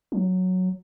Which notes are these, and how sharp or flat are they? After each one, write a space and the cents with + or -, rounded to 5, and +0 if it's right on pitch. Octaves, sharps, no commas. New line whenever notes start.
F#3 -5